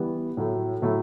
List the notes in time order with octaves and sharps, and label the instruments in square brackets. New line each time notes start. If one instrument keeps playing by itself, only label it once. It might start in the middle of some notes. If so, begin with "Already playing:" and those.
Already playing: [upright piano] E3 G3 B3
A2 F#3 A3 E4
A2 F#3 A3 E4